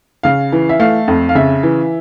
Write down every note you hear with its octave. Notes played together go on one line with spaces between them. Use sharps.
C#3 F5
E3
E5
A3 F5
F2
F5
C#3 E5
E3